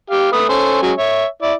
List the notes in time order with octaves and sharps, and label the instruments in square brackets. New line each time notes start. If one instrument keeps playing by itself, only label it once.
[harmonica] G4 F5
A3 B4 D#6
C#4 A4 C5
F#3 G#3 C#4
C#5 E5
E4 D5